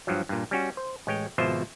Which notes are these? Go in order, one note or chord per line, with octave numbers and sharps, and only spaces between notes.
G2 F3 F#3
G2 A#2
G3 C#4 F#4
C5
A1 G#3 C#5 G5
G#1 B2 F3 F4 C5 E5